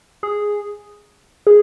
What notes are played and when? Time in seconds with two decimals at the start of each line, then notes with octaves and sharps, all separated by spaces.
0.23 G#4
1.47 G#4